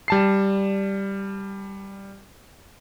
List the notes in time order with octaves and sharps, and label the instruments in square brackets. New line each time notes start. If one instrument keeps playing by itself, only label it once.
[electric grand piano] G3 A5 C7